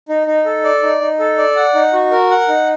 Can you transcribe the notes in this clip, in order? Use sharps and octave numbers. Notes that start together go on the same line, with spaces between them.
D#4
D#4
A4
D5
D#4
D#4
A4
D5
F#5
D#4
F#4
A#4
F#5
D#4